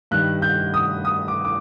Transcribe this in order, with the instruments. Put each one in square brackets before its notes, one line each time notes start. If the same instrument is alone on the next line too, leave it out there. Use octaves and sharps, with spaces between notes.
[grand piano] G2 D#3 G3 F#6
G6
D#6
D#6
D6
D6